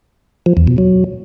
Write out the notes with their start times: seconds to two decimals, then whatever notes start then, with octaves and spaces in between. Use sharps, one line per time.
0.46 F3
0.57 E2
0.67 B2
0.78 F#3